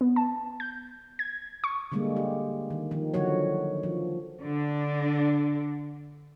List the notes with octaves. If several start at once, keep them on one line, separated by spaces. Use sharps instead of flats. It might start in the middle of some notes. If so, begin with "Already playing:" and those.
B3
A5
G6
G#6
C#6
D3 G3 G#3 A#3
G4
D#3
D#3 F3
D3 F3 F#3 F#4 C#5
F3
D3 D4